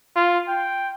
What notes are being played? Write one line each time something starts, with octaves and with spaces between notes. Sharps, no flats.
F4
G5